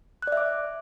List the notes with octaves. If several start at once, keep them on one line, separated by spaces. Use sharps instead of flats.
D5 E5 D6 F#6